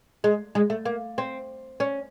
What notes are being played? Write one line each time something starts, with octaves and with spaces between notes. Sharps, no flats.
G#3
G#3
A3
A#3
C4
C#4